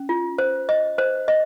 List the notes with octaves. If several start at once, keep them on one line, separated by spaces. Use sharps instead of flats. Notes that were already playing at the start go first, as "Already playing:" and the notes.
Already playing: C#4
F4
C5
D#5
C5
D#5